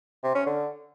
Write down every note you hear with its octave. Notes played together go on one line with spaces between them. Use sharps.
C3
C#4
D3